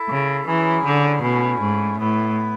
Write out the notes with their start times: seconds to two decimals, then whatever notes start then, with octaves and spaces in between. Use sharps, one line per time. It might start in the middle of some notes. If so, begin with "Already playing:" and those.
Already playing: E4 A4 E5
0.09 C#3
0.46 E3 F#3 C#4 E4 G#4
0.85 D3
1.22 B2 A3 C#4 E4
1.61 G#2
1.98 A2 B3 E4 B4